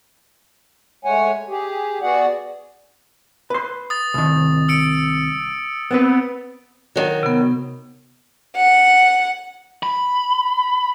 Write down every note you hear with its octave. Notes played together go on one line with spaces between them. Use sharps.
G#3 A3 C#5 F#5 G#5
G4 G#4
B3 F#4 G#4 D5 F#5
B4 C6
D#6 A6
C2 D#3
E6 C#7 D7
B3 C4 B4
D#3 F#3
C3 B3
F#5
B5